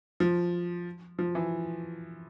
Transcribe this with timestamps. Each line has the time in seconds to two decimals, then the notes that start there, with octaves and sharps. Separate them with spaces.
0.20 F3
1.19 F3
1.35 E3